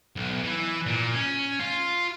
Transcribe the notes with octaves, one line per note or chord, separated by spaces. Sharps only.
B1
E3
A#2
C#4
F4